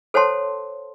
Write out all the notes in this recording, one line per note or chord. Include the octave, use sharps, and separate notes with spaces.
A4 C5 C#5 F#5 A5 C6